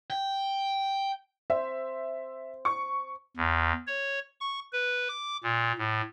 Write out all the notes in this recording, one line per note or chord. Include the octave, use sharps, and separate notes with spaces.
G5
C5 E5
C#6
E2
C#5
C#6
B4
D6
A#2
A2